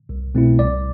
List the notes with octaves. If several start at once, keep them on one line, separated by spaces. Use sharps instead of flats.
C2
B2 A3 C4 E4
C2 D5